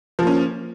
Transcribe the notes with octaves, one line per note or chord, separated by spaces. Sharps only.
F3 A#3 C#4